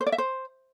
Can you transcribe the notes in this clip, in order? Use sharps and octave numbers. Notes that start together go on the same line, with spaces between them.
C5
D5
E5
C5